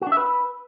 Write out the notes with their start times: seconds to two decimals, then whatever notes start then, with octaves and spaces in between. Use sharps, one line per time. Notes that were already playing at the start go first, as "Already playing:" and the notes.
0.02 F#4
0.07 D4
0.12 E5
0.17 B4